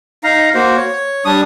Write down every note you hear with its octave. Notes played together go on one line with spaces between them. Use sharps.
D#4 F5 A#5
A#3 F#4 C5
C#5
G3 D4 D#6